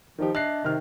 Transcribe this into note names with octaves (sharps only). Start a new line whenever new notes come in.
D#3 F3 D#4 G4
D4 D#5 E5 F#6 A#6 C7
C3 D#3 F6